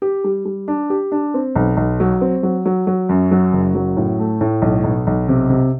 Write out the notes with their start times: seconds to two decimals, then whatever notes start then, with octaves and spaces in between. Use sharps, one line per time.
0.02 G4
0.24 G3
0.45 G3
0.68 D4
0.90 G4
1.12 D4
1.34 C4
1.56 B1
1.77 B1
2.00 F#3
2.21 C4
2.43 F#3
2.66 F#3
2.87 F#3
3.09 F#2
3.31 F#3
3.53 F#1
3.75 F#3
3.97 A2
4.19 A3
4.41 A2
4.62 B1
4.84 B1
5.07 B1
5.28 C3
5.50 C3